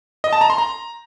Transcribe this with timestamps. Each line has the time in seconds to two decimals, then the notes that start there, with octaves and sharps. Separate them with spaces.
0.24 D#5
0.33 A5
0.41 A#5
0.50 C6
0.58 A#5